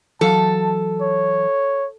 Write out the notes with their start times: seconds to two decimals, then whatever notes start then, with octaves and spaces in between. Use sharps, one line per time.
0.21 E3 F#3 A4 F5 A5
1.02 C#5